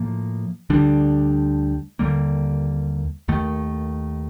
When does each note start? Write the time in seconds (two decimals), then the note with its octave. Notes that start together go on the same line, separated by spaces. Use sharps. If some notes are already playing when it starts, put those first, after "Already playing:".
Already playing: A2 F3 A#3
0.70 D2 D3 G3 D4
1.99 D#2 D3 G3 A#3
3.28 D#2 D#3 A3